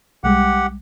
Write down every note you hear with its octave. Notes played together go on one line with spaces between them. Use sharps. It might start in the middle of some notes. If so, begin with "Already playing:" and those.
B1 G3 G#3 G4 F#5